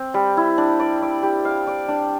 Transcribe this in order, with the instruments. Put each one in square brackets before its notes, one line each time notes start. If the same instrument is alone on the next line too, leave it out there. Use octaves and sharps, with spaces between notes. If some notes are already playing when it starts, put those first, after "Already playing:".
Already playing: [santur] C4
G3
E4
D4
D5
D5
G4
F5
D5
D4